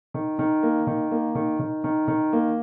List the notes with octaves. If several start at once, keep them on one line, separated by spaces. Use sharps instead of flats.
D#3
D#3
A#3
D#3
A#3
D#3
D#3
D#3
D#3
A#3